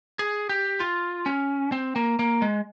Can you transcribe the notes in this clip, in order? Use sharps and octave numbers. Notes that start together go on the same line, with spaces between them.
G#4
G4
F4
C#4
C4
A#3
A#3
G#3